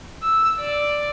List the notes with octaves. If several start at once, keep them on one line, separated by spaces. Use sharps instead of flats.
E6
D5